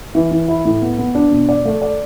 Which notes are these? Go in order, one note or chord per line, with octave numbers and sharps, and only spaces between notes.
E3
E3
E4
A2
B3
B3
D4
B2
D5
A3
D5